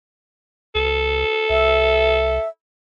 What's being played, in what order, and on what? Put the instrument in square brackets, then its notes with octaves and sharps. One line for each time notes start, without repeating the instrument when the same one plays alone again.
[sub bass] C#2 [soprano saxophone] A4
[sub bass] C2 [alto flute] E5